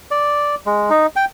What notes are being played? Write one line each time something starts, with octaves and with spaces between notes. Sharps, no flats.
D5
G#3
D#4
G5